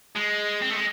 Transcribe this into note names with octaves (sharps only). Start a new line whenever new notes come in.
G#3
C4
A3
G#3